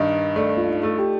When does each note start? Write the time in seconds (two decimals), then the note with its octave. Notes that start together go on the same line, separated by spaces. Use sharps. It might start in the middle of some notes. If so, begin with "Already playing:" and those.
Already playing: G2 D#3 D#5
0.36 A3 D5
0.57 F4
0.67 D#4
0.83 A3
0.99 G4